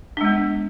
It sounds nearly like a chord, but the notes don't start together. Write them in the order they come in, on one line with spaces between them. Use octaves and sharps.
D4 G#3 B3